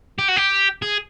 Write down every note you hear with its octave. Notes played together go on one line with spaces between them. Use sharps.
G4
F#4
G4
G#4